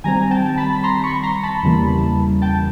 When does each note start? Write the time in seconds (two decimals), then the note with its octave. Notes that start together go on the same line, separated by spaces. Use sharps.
0.04 D#3 G3 C4 G#5 A#5
0.31 G5 A5
0.57 A5 B5
0.73 B5
0.84 A#5 C6
1.04 B5 C#6
1.23 A#5 C6
1.43 A5 B5
1.63 E2 C#3 E3 G3 A#3
2.42 G5 A5